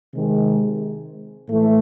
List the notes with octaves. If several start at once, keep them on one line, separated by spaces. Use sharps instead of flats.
C3 D#3 G#3
A2 E3 A3